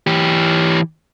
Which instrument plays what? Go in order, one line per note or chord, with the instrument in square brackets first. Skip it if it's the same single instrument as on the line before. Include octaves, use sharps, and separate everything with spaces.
[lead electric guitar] E3 G4